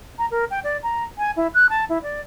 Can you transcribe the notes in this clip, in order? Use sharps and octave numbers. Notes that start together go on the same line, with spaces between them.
A#5
A#4
G5
D5
A#5
G#5
E4
F#6
A5
E4
D5